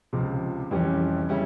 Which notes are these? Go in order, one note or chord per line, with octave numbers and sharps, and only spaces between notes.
C#2 C3 F3
F2 E3 G3 C#4 G4
C#3 G3 C#4 E4